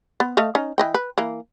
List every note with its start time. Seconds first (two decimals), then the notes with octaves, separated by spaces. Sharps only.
0.20 B3
0.37 A3 D#5 F5
0.55 C#4 D#4
0.78 E3 D#5 G5
0.94 B4
1.18 E3 A#3